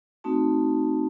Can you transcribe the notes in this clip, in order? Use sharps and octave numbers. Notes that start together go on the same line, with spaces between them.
A3 C4 D#4 F#4 A5